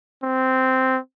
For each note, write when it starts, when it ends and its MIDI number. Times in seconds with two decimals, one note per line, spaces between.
0.23 0.99 60